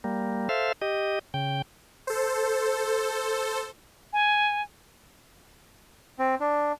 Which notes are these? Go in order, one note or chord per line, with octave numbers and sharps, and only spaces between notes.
G3 A#3
A4 C5 E5 F5
G4 D#5
C#3 G5
A4 C5
G#5
C4
D4